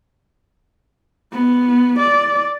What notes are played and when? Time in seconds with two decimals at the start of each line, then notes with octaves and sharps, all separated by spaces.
1.33 B3
1.99 D5